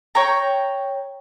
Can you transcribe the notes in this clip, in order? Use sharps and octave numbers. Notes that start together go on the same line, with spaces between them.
C#5 G5 A#5